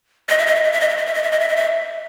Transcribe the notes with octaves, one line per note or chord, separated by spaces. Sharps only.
D#5
E5
D#5
E5
D#5
E5
D#5
E5
D#5
E5
D#5
E5
D#5
E5
D#5
E5